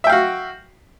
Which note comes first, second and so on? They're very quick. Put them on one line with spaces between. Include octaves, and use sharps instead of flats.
E5 G5 F5 F#4